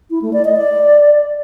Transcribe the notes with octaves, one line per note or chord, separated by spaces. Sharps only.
E4
A3
D5
D#5
D5